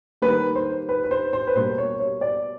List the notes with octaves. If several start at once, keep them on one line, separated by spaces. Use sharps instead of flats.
D#3 G3 A#3 B4
C5
B4
B4
C5
C5
B4
B2 G3 A#3 C5
C#5
C#5
D5